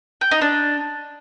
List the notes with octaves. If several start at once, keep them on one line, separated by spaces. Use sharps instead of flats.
G5
D#4
D4